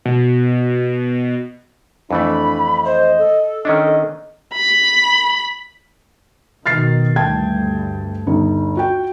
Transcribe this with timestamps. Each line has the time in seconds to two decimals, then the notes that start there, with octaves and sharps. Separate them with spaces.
0.05 B2
2.11 F2 E3 A3 D4 B5
2.85 C5 D#5
3.19 A4
3.65 D#3 C#4 D4 D#5
4.54 B5
6.66 B2 D#3 F6 A6 C7
7.16 D2 G2 G5 A5 G#6
8.27 G1 D#4
8.77 F#4 G5